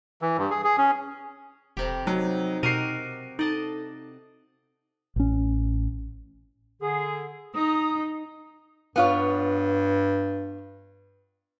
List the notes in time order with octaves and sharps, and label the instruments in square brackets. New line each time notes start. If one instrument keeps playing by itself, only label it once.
[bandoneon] E3
G2
G#4
G#4
C#4
[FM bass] E1 [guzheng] F2 C3 G4
[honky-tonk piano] F#3 [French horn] D#4
[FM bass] B2 [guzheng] F#4 G4 A#4 [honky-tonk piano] C7 D#7
[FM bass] D#4 [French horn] A4 [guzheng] D5 D#5 A5
[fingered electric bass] A1 C#4
[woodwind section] D3 G#4
[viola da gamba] D#4 [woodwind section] A#5 D#6
[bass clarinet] G2 [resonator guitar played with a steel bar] B3 F4 C#5